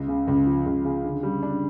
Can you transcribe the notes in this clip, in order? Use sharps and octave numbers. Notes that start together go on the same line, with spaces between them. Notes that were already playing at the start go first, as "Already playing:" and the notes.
Already playing: C#2
C#3
C#2
F3
C#2
C#3
D3
G3
D4